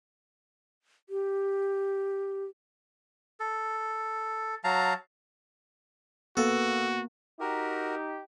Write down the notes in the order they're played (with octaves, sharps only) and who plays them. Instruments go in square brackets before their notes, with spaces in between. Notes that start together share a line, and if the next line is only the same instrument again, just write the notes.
[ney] G4
[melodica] A4
F#3 F5 A5 A#5
[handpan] A#3 B3 [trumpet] F#4 [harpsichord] A4
[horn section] D#4 G4 [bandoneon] F#4 A#4